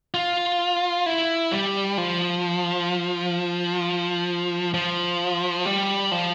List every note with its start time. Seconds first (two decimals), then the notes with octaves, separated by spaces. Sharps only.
0.14 F4
1.06 E4
1.52 G3
1.98 F3
4.74 F3
5.66 G3
6.11 F3